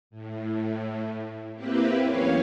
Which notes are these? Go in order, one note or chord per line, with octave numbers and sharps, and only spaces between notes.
A2
A#3 C4 E4 G4 B4
E2 F#3 C#4 C#5 F5